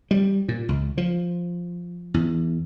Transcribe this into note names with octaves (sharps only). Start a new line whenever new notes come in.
G3
A#2
C#2
F3
E2